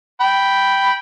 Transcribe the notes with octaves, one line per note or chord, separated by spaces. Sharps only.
G5 B5